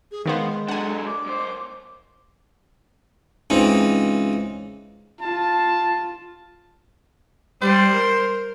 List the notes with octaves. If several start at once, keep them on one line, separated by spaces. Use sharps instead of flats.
G#4
D#3 G#3 B3 C5 F5
A#4
F#3 D4 A4 F#5 G#5
D6
F#2 C5
C#2 E3 C4 D#4
F4 A5
G3 C5
A#4